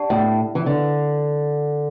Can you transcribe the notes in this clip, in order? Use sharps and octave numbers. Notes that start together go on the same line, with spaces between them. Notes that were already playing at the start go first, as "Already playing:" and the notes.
Already playing: D4 G4 D5 F#5 A5
A2
E3
D3